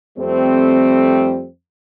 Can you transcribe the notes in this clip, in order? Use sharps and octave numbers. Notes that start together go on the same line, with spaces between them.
F2 G3 A3 C4